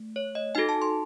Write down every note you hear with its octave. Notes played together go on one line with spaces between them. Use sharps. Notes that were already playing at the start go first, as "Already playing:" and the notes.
Already playing: A3
C#5
D#5
D#4 F#4 A4 G#5
A5
C6